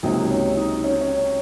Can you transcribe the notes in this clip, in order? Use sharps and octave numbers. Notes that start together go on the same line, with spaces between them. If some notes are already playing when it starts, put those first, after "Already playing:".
C#2 C3 F#3 A#3 D#4
C#4
D#4
C#4
C#4